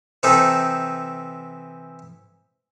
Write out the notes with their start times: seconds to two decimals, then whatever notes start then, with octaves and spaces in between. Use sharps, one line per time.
0.23 C3 E3 C4 D#4 A4